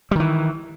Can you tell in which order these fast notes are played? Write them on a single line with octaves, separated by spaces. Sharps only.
G3 D#3 E3